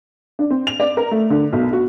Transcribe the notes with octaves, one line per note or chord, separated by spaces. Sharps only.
D4
C4
F7
D5
A#4
A3
D3
B1
F#4